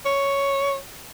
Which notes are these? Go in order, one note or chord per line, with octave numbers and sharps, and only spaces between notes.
C#5